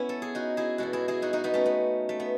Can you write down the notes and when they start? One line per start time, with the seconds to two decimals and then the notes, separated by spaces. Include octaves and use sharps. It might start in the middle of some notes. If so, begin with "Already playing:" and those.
Already playing: B3 C#4 E4
0.09 A4
0.22 G#4
0.35 D#4 F#4
0.57 E4 G#4
0.78 E2 B2 G#3 F#4 A4
0.93 E4 G#4
1.08 E4 G#4
1.22 D#4 F#4
1.33 D#4 F#4
1.44 B3 D#4
1.54 A3 C#4
1.66 B3
2.09 A3
2.20 B3